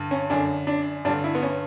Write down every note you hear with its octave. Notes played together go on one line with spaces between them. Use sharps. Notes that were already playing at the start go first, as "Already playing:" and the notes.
Already playing: G2 D3
C#4
F#2 D3 D4
D4
G2 D3 D4
E4
B3
C#4